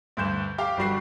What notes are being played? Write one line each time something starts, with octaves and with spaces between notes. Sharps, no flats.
D2 G2 G6 E7
G4 F5 G5
G1 G3 F#4 C7